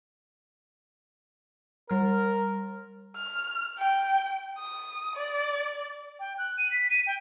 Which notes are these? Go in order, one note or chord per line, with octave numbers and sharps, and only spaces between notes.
G3 A#4 F6
F6
G5
D#6
D5
G5
F#6
D#7
B6
D#7
G5